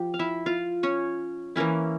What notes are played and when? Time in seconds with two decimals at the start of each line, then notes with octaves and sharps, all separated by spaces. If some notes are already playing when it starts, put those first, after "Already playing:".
Already playing: F3 G4 G5
0.14 F5
0.19 E4 E5
0.46 F4 F5
0.83 C#4 C#5
1.56 E3 A#3 C#4 E4